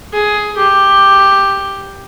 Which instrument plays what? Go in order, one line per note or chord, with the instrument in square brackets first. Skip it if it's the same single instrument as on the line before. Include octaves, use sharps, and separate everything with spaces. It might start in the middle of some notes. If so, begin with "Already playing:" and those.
[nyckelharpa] G#4
G4